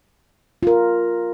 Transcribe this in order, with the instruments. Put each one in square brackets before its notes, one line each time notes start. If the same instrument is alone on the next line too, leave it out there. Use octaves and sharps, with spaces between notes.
[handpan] F4 A#4